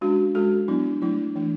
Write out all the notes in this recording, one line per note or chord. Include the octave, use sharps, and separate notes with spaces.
G#3 C#4 D4 F#4
G#3 C#4 F#4 A4
F#3 B3 D4 E4
D4
F#3 A3 D4 E4
E3 A3 D4